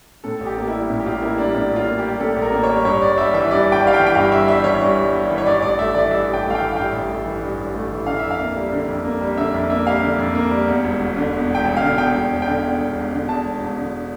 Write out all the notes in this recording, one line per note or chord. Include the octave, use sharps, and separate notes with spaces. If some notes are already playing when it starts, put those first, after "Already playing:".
A2 A4
A1
G4
A#3
E4
G3
A2
G4
A1 F4
A#3 E4
G3 D4
A2 D4
A1
F4
A#3
G4
G3
A2 A4
A1
A#4
A#3
C#5
G3
G2 C#5
G1 D5
G3 E5
E3 E5
G2 D5
G1
G5
G3 F5
G5
E3
G5
G2 F5
G1 E5
G3 E5
E3 C#5
G2
G1
G3
E3
C#5
G2 D5
A1 D5
A3 E5
E3 D5
G2 E5
A1
G5
A3
F5
G5
E3
F5
G2 G5
A1
A3
E3
G2
A1
A3
E3
D3 F5
F2 E5
F5
A#3
G3
D3
F2
A#3
G3
D3 E5
F2
A#3 E5
G3 F5
D3
F2
A#3
G3
E2
E1
E1
D3
E2
E1 G5
E1
F5
D3
E2 G5
E1
E1
G5
D3
E2
E1
E1
D3
E2 A5
E1
E1
D3